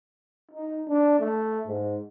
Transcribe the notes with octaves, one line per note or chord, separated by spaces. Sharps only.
D#4
D4
A3
G#2